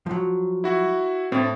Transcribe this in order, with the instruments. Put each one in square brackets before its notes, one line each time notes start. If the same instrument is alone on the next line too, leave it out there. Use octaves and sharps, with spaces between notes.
[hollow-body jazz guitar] F3 F#3
[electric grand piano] E4 F#4
[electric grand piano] A2 [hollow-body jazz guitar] C4 D4